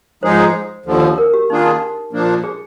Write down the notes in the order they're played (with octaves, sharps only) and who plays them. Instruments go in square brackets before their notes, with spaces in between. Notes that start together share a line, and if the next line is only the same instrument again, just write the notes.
[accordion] G#2 F3 G#3 D#4 G#4 [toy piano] C5
[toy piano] C5
[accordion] D#2 D3 F3
[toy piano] A#4
G4
[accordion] D#3 A#3 D4 F4 G#4 [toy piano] D#4
[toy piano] D#4
[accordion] A#2 F3 A#3 D4
[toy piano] G#4